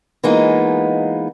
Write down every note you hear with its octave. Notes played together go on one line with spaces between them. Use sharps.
E3 G#3 A#3 B3 D#4 F4